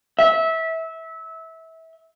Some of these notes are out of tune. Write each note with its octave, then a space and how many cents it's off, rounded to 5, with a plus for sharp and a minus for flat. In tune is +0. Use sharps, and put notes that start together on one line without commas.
E5 -20